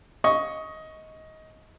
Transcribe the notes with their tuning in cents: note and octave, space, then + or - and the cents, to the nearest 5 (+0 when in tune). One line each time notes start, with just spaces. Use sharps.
D#5 +15 C#6 +0